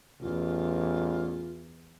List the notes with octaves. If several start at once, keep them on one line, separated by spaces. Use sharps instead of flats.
A1 E2 F4